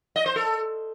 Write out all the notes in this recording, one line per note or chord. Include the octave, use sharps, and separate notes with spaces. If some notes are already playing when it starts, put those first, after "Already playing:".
D#5
C5
A4